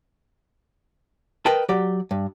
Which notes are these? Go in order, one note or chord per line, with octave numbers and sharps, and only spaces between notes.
A#4 B4 D#5 G5 A5
F#3 G4 D5
G2